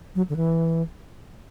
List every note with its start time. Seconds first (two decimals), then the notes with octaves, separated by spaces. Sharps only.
0.15 F#3
0.29 D3
0.36 E3